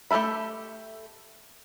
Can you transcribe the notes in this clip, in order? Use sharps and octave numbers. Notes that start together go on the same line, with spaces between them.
A3 G4 A4 E5 B5